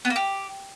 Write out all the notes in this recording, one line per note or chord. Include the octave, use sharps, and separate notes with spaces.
B3
A#3
G4